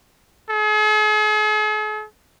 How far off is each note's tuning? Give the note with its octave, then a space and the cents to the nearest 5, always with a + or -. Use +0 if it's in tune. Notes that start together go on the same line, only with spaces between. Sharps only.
G#4 +45